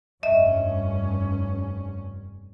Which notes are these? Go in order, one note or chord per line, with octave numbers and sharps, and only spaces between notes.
F1 G2 C#4 D#5 E5